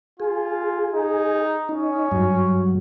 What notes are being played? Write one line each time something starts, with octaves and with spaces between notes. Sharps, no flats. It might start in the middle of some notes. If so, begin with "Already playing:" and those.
F4 G#4
D#4
C#4 D#4
G2 F#3